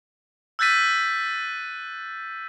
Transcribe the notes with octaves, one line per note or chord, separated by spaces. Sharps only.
E6 F#6 G6 A6 B6 D#7